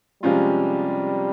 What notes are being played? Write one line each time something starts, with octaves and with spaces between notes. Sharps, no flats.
C3 F3 G3 G#3 C#4 F4